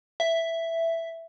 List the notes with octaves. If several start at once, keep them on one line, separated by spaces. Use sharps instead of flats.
E5